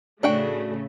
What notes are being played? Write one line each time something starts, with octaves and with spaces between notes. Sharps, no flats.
A2 C#3 A3 D4 F#4 G5